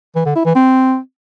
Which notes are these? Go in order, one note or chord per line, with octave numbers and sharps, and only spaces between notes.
E3
D3
E4
E3
C4